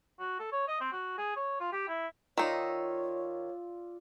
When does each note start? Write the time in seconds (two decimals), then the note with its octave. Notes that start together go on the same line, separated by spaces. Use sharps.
0.19 F#4
0.39 A4
0.52 C#5
0.68 D#5
0.80 C4
0.93 F#4
1.18 G#4
1.36 C#5
1.60 F4
1.72 G4
1.88 E4
2.38 D#3 D#4 F4 C#5 D5 E6